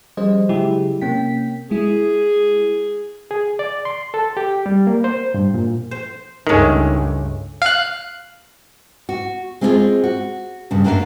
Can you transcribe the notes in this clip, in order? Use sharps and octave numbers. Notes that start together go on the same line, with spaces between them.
F3 G3 C#4 G#4 C5 D#5
C#3 F#3 G#3 E4 G4 G#4
C3 A#3 C#4 G5 B6
G#3 E4 G#4
G#4
D5
C6
A4
G4
G3
A#3
C5
G2
A#2
C5
C#2 G2 D#3 G#3 A3 C#4
F5 F#6
F#4
G#3 C4 C#4 E4 F4 G#4
F#4
G2 C#3
F#2 F#3 A#3 D4 F5